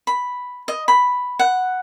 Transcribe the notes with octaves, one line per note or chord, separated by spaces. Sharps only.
B5
D#5
B5
F#5